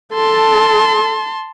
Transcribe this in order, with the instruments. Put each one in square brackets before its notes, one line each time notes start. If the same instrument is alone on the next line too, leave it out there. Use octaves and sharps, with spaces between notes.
[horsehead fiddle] A4 [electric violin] A5 C6